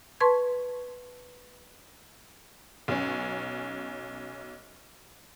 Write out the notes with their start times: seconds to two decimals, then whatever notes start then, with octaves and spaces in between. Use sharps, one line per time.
0.20 B4 A5 C6 C#6 G#6
2.88 B1 C#4